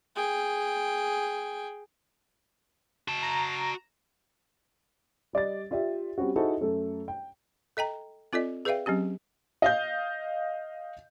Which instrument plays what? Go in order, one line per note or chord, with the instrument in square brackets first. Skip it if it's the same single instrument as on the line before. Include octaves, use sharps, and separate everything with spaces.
[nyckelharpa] G#4 G5
[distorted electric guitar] F#4 A5
[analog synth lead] A#5
[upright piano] G3 D5 D#5 A6
F4 G4 D5 E5
G3 C4 C#4 F#4
D#4 E4 F#4 G#4 A4 C5
F#2 A3 A4
G5
[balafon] A4 D#5 G5 A#5
C4 F4 A4 D5 D#5
G#4 B4 D5 E5 F5 G5
F#3 C4 C#4 G4
[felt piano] D#5 F5 G6